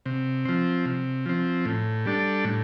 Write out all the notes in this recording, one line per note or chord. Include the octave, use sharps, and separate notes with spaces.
C3
F3 C4
C3
F3 C4
A2
G3 D4 A4
A2